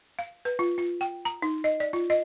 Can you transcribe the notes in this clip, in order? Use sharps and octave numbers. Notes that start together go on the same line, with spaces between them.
F5
B4
F4
F4
G5
A#5
D#4
D#5
D5
F4
D#5